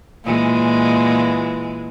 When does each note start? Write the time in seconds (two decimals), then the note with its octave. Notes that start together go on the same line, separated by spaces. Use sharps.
0.24 A#2 E3 G#3